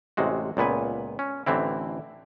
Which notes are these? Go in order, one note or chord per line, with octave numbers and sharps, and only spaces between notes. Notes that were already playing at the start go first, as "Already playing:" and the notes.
A1 C3 G#3 F#4
C#2 A#2 B3 B4 G#5
C#4
A1 D3 E3 C4 E4